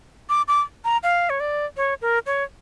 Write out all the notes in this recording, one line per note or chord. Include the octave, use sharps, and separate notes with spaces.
D6
D6
A#5
F5
C#5
D5
C#5
A#4
C#5